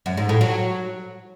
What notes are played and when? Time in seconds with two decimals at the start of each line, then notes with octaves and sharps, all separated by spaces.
0.06 F#2
0.17 G#2
0.29 A2
0.41 F#3